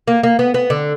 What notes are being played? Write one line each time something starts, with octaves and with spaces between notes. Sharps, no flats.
A#3
A#3
B3
B3
D3